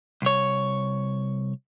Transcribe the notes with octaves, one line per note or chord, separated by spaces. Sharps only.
C2 C#5